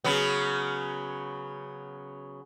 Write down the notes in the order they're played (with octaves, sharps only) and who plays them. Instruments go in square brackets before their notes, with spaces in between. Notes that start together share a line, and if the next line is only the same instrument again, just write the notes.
[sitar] C#3 F#3 B3